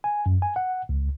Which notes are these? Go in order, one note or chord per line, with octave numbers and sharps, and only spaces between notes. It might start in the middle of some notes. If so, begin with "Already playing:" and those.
G#5
F#2
G#5
F#5
C#2